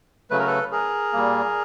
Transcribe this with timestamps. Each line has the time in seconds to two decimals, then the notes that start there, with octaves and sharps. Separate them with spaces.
0.31 C#3 F#3 A3 B4
0.40 A#4
0.47 A4 B4
0.72 G#4 A#4
1.13 A#2 G3 A#3